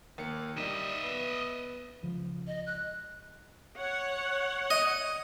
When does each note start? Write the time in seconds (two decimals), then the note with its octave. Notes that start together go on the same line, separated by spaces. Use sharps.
0.18 D#2 A#3 C#7
0.57 G3 D#4 D#5 E5
1.03 B3
2.03 C#2 C#3 F3
2.47 D#5
2.66 F#6
3.77 C#5 F#5
4.70 D#5